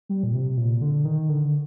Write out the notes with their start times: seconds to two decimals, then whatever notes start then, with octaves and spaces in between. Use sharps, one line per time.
0.09 G3
0.23 A#2
0.33 C3
0.57 A#2
0.81 D3
1.05 D#3
1.29 D3